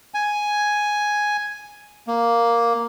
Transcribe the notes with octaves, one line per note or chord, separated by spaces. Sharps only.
G#5
A#3